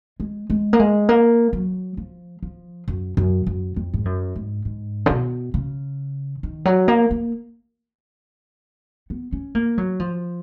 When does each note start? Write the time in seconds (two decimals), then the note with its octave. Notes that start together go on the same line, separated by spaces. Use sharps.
0.20 G#3
0.50 G#3
0.73 A#3
0.80 G#3
1.09 A#3
1.53 F#3
1.97 F3
2.43 F3
2.88 F#2
3.17 F#2
3.47 F#2
3.76 F2
3.94 G#2
4.05 F#2
4.36 G#2
4.65 G#2
5.06 C#3
5.10 B2
5.54 C#3
6.43 D#3
6.65 F#3
6.88 A#3
7.11 A#3
9.10 B3
9.33 C#4
9.55 A#3
9.78 F#3
10.00 F3